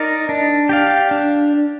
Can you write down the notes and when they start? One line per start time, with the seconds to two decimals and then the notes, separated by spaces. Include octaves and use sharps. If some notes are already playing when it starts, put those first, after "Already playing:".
Already playing: D#4 A#4 D5
0.29 D4
0.69 G4 D5 F5
1.11 D4